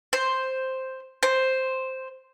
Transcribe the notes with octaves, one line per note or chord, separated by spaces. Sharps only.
C5
C5